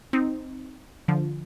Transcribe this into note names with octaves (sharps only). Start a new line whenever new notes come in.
C4 D#4
D3 F3